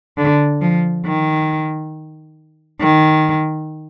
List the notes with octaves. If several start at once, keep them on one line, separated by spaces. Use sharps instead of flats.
D3
F3
D#3
D#3